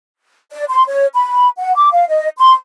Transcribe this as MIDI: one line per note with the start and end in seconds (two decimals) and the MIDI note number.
0.51 0.64 74
0.70 0.84 84
0.88 1.06 73
1.14 1.49 83
1.58 1.75 78
1.75 1.89 86
1.92 2.06 77
2.09 2.28 75
2.38 2.53 84